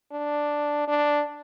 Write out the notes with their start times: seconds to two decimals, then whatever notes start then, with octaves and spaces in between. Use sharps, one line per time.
0.12 D4
0.88 D4